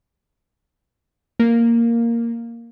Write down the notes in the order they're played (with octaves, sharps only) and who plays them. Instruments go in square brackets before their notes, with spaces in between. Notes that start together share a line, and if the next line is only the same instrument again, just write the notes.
[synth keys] A#3